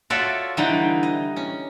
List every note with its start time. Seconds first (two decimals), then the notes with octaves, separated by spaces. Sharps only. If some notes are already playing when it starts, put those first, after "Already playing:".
0.10 F4 F#4 A4 C#5 D5 E5
0.57 D3 E3 G3 D#4 G5
1.03 D#5
1.36 C#4